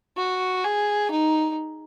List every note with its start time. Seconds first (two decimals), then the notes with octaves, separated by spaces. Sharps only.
0.17 F#4
0.64 G#4
1.11 D#4